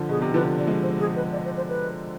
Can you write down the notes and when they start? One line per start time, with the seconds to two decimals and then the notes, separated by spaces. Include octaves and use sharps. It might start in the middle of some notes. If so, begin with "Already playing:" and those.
Already playing: D3 F3
0.09 B2 G#4
0.21 C3
0.34 D3 F3 B4
0.58 D5
0.67 F3 G#3
0.83 C5
1.00 G#4
1.16 B4
1.32 D5
1.45 C5
1.57 C5
1.69 B4